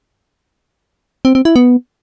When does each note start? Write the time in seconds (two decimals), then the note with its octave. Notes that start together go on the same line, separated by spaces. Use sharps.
1.25 C4
1.35 C4
1.45 E4
1.56 B3